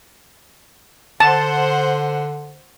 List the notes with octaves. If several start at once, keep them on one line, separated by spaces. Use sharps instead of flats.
D3 C5 F#5 A5